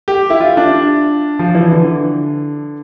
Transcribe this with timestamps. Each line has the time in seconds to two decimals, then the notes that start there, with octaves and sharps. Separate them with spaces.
0.08 G4
0.30 E4
0.40 F4
0.57 D4
1.39 F3
1.55 E3
1.72 D3